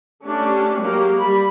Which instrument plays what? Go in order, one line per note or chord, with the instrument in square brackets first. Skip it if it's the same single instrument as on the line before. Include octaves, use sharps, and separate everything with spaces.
[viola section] A3 C#4 D4 G4
F#3 G#3 A#3 G4
G3 B5